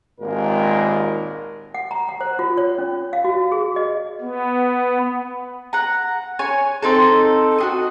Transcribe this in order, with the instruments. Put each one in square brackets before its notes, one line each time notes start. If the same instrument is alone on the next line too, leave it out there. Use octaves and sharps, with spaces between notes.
[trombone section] G#1 D#2 A#2 G#3 A#4
[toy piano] F#5
A#5
F#5
C5
F4
C#5
C#4
F5
F#4
G#4
D#5
[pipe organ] B3
[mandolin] F#5 A#5
C#5 G#5
C4 D#4 A4
F#4 G#4 D#5